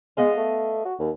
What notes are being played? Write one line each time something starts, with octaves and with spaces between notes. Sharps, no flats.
G#3 B3 D#5 F5
A3
F#4
D#2